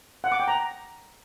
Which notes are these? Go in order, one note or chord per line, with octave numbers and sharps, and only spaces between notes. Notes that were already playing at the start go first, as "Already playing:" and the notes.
F#5
D6
G5
A#5